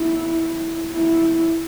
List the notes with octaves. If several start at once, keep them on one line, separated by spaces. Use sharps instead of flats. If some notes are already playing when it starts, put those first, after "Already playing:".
Already playing: E4
E4